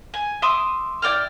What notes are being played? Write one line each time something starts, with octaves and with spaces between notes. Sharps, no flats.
G#5
E5 C6 D6 D#6
E4 D5 G5 F6